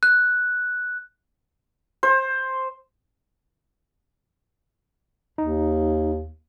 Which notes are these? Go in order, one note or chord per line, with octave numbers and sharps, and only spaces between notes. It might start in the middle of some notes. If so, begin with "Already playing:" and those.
F#6
C5
D#2 D#4